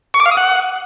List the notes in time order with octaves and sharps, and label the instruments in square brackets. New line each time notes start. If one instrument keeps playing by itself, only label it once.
[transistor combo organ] C#6
D6
F5
D#6
F#5